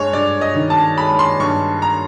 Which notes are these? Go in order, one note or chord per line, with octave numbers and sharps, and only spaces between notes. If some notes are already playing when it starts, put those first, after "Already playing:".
Already playing: G2 G#3 C#5
G2 D5
D#5
D#3
A5
G#3 B5
C6
G2 C#6
A#5